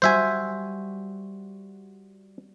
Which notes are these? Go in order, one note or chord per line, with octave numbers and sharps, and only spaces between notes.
G3 F#4 C5 E5 G#5